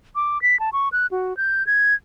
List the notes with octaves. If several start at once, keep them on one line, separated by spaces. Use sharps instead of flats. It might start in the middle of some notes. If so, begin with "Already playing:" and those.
D6
B6
A5
C#6
F#6
F#4
G6
G#6